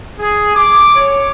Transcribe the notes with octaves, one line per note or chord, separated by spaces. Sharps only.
G#4
D6
C#5